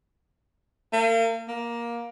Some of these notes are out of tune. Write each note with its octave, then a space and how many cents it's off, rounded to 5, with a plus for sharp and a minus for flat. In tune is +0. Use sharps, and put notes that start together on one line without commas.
A#3 -40
A#3 +15